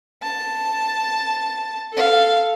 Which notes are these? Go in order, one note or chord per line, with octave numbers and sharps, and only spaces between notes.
A5
A4 F5